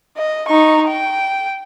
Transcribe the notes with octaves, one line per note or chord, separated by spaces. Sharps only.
D#5
D#4 C#6
G5